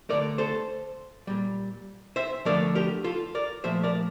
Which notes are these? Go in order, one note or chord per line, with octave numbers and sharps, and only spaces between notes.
D3 A3 A#4 D5
A4 C5
A#2 G3
C5 E5
D3 F3 A3 A#4 D5
G4 A#4
F4 A4
A#4 D5
A#2 F3 A3 C5 E5
A#4 D5